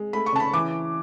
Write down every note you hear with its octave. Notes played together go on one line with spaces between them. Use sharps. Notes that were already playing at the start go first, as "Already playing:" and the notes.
Already playing: G#3
A3 B5
C#6
C#3 A5
B5
E3 D6